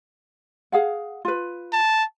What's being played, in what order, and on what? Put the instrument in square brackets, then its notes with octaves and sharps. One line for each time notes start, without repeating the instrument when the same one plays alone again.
[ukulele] G#4 F5 F#5
F4 B4
[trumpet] A5